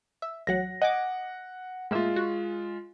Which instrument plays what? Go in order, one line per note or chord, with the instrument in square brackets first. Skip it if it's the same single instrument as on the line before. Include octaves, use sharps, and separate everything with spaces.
[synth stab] E5
[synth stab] A1 F#3 F#5 [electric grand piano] A#6
[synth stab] D#5 G#5 D6 [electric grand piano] F#5
[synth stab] A2 A#3 E5 [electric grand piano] G#3 F4
[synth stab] F#4